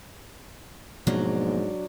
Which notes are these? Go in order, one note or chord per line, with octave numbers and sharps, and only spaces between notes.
G#2 B2 F3 F#3 A#3 D4